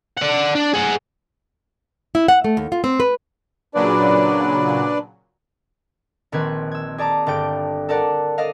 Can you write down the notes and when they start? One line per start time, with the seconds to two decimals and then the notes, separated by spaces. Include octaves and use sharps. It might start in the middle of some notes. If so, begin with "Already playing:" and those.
0.17 D5 F#5
0.55 D4
0.74 G#4 F#5
2.15 E4
2.28 F#5
2.44 A3
2.57 D#2
2.72 F4
2.84 C4
3.00 B4
3.75 A#2 C#3 F#3 D4 B4 D5
6.32 A#1 D#3 C4 B4 G#6
6.71 E6 G#6
6.98 G#4 D5 A5 A#5 D6
7.27 G1 D5 G5 D7
7.89 A4 A#4 D5 F#5 A5
8.38 A4 D5 D#5 F5